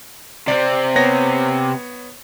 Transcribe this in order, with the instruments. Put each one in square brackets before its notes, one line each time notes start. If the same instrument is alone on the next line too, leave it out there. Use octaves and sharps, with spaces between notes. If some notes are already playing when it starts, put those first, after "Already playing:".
[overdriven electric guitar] C3 C4 [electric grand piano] D5
[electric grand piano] B3 C#5 A#6